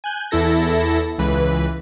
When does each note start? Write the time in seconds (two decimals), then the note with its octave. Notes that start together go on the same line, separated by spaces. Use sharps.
0.04 G#5 F#6 G6
0.31 E2 E4 A4 A#6
1.19 C#2 E3 B4